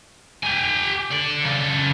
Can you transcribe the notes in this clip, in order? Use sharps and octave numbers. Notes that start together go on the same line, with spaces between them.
G4 G#5
A4 D5
C#3 A4